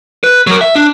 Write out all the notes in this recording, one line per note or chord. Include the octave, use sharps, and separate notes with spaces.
B4
F#3 A#4
E5
D4